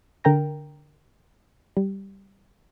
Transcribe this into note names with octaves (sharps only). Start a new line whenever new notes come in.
D3 A#4 G5 A#5 A#6
G3